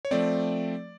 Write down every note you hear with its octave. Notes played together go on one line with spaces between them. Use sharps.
C#5
F3 A3 C4 D5